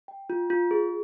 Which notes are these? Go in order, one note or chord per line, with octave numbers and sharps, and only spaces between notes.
G5
F4
F4
G#4